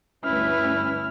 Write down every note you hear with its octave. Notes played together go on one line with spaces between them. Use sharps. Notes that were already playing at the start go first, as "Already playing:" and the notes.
D2 G2 C#4 E4 B4 F6